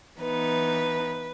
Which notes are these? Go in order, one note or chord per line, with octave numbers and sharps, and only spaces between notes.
E3 B3 D#4 B4